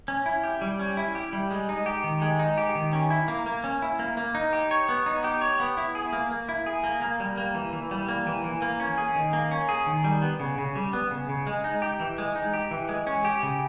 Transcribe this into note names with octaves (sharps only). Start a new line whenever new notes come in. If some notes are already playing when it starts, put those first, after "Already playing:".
C#4
E4
G4
G3
C#4
E4
G4
G3
G#3
D#4
G4
D#3
G#3
D#4
G4
D#3
C#4
E4
A#3
A#3
C#4
E4
A#3
A#3
D#4
G4
C#5
B3
D#4
G4
C#5
B3
E4
G#4
A#3
A#3
E4
G#4
A#3
A#3
G3
A#3
E3
E3
G3
A#3
E3
E3
A#3
C#4
G#4
D#3
A#3
C#4
G#4
D#3
G3
B3
C#3
C#3
G3
B3
C#3
C#3
G#3
D#4
G4
E3
G#3
D#4
G4
E3
G#3
C#4
G4
C#3